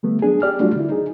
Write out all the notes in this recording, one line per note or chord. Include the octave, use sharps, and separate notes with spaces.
D3 G3 A3 B3
F#3 B3 D4 G#4
G4 D5 F6
F#3 G3 A3 D4 F4 F#4
D3 E4
D#4 G#4